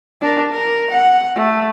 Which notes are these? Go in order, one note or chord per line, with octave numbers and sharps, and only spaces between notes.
D4 A#4
A#4
F#5
A3